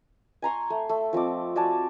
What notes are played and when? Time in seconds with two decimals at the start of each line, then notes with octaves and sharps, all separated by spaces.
0.42 G#5 A#5 C6 C#6
0.70 A3
0.89 A3
1.13 F3 C4 D#5 D6
1.56 F#4 D5 G#5 A5